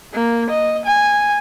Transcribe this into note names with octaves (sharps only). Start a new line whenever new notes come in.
A#3
D#5
G#5